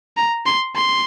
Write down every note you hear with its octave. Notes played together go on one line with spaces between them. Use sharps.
A#5
C6
C6